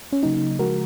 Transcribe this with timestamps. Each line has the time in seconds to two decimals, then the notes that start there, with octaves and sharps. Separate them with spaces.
0.13 C#4
0.22 C#3 F#3 A#3 D#4
0.59 C#3 F3 G#3 F#4 A#4